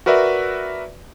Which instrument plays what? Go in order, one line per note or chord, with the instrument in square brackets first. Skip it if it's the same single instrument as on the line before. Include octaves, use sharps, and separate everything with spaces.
[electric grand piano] F#4 A#4 B4 D5 E5